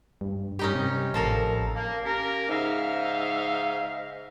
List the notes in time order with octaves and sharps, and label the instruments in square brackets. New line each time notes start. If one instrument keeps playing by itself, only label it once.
[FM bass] G2
[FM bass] G3 [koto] C#4 D#4 G4
[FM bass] C3
[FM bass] A1 [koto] F3 A4 A#4
[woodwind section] A#3
A#3 C#4 G4 A#4
G#2 C#3 D#4 E5 F5